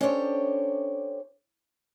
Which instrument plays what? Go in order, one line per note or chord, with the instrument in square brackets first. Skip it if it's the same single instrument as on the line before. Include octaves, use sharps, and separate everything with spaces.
[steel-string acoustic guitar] C#4 D4 G4 A4 C5 C#5